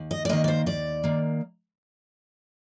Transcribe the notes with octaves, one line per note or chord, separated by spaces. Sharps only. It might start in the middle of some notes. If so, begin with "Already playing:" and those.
Already playing: D#2
D#5
D5
D#3 A#3 D#5
D5
C5
D#2 D5
D#3 A#3